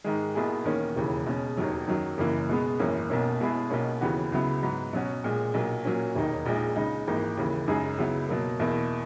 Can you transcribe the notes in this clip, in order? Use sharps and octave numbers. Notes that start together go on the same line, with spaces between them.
G#2 D#3 G#3
B1 B2 A#3 E4 G#4
E2 D#3 A#3 C#4
E1 D#2 C#3 E3
B2 G#3 C#4
E1 D#2 D#3 F#3
F#2 D#3 F#3
F#1 F#2 E3 A#3
B2 G#3 B3
G#1 F#2 E3 A#3 C#4
B1 B2 A#3 C#4
B2 G#3 B3 E4 G#4
B1 B2 A#3 C#4
D#2 C#3 E3 B3 F#4
C#2 C#3 F#3 B3 E4
G#2 F#3 B3
B2 F#3 C#4 F#4
A#1 A#2 G#3
B1 A#2 F#3 A#3
A#2 F#3 A#3 C#4
E1 D#2 D#3 A#3 D#4
A#1 A#2 G#3 D#4
C#2 C#3 G#3 D#4
G#1 G#2 E3 A#3 D#4
D#2 C#3 E3 A#3
F#2 C#3 G#3 D#4 G#4
C#2 C#3 F#3 B3 E4
B2 F#3 A#3
E2 B2 A#3 E4